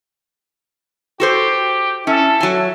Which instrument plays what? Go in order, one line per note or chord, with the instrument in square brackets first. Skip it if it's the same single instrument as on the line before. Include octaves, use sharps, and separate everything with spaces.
[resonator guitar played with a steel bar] F#4 A4 C5 [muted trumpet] G4
[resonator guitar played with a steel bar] C#4 [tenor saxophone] E4 [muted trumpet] A4
[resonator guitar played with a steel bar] F#3 G#5